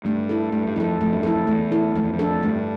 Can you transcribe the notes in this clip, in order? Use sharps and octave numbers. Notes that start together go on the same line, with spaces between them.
G2 A3
E4 A4
G2 A3
G2
F2 E4 A4
F2 A3
G2
F2 E4 A4
F2
E2 A3
E4 A4
F2 A3
E2
F2
D4 A4
G2 A3